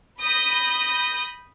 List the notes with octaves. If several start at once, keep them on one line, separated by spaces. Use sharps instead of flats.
B5 D#6 G6 A#6